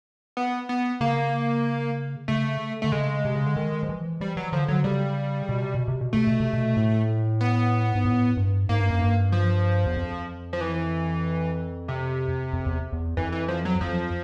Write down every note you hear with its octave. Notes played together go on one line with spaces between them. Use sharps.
B3
B3
C#3 A#3
C#3 A3
D3 A3
C#3 G#3
C3
C#3
D3
D#3
F3
E3
F3 G3
E3 F#3
D3 F3
D3 F#3
C#3 G3
B2
C3
B2
C3
B2
C3 A3
B2
C3
B2
A2
B3
G#2
A2
G2
G#2 A#3
G2
F#2
G2
F3
E2
F2
F3
E3
C3
F2
E2
E2
F2 E3
E3
F3
F#3
F2 F3